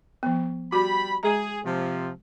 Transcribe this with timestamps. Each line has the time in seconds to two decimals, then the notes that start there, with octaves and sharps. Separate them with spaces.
0.23 F3 B3
0.72 G3 F#4 B5
1.23 G#3 G#4 A#5
1.65 C3 F3